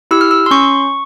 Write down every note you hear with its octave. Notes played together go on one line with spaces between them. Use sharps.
E4 G4 E6
F6
E6
C6
C#4 C#6